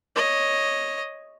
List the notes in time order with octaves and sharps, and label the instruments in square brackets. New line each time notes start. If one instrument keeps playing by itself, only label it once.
[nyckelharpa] C#5 D#5